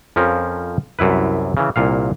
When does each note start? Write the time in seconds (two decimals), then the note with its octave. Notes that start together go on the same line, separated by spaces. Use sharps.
0.16 F2 F3 C#4 A#4
0.99 C2 F#2 E4 B4
1.57 C#3 E3
1.76 C2 A#2 F5